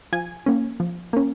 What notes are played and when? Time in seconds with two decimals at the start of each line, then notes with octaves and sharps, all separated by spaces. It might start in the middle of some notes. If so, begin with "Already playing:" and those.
0.13 F3 G#5
0.46 A#3 C#4
0.80 F3
1.13 A#3 C#4